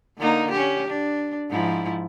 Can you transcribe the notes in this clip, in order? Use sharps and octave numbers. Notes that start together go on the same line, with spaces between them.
D3 A#3 D#4
C#4 G4
D4
G#2 F3 E4